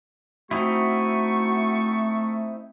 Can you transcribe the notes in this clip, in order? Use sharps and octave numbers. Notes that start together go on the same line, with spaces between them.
A3 C4 D#4 E4 F#4 C#6